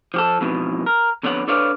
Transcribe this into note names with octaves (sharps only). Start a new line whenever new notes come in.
F3 G4 A4
F2 G#2 B2 E3
A#4
F2 D3 B3 C#5 F#5
D4 A4 B4 C#5 D5 F5